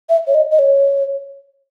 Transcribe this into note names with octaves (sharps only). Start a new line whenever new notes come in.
E5
C#5
D#5
D#5
C#5